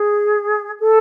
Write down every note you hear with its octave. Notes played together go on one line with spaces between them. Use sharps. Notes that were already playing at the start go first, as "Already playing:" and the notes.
Already playing: G#4
A4